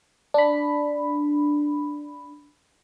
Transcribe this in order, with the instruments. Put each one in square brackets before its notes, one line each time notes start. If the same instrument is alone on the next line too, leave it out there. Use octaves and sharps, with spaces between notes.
[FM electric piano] D4 B5